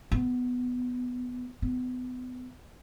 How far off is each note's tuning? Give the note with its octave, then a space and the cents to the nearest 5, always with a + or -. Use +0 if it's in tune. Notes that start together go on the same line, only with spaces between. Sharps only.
B3 +10
B3 +30